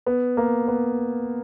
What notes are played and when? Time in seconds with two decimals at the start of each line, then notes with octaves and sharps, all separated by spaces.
0.06 B3
0.37 A#3
0.68 B3